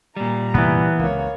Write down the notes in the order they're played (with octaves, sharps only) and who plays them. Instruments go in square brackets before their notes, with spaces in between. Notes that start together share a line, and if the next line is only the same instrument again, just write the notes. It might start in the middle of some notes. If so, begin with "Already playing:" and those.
[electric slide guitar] A#2 G3 [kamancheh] A#5
[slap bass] F#2 C3 A#3 [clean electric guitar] E3 B3
[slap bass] C#2 [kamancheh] A#3 C#5